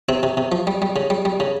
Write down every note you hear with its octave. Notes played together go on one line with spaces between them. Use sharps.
C3 C4
C3
C3
F3
G3
G3
C#3
G3
G3
C#3